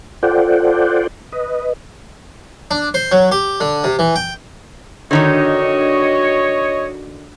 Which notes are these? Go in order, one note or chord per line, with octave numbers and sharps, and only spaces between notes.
F4 A4 C5 D5 F#5 G5
B4 D#5
D4
C5
F#3
G4
D3
C3
E3
G5
D3 D#3 D4 D#4 F#4 C#5 D#5